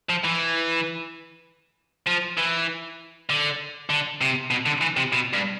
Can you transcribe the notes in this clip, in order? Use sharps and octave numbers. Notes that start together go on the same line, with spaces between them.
F3
E3
F3
E3
D3
D3
C3
B2
D3
E3
C3
B2
G2